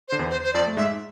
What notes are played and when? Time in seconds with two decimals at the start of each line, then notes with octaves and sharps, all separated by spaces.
0.08 C5
0.12 D3
0.19 E2 E3
0.31 C5
0.43 C5
0.53 F2 F3 D5
0.67 A3
0.77 G#2 G#3 E5